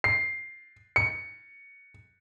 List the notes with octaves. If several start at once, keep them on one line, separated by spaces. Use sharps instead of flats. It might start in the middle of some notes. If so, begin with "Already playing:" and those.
C7
C#7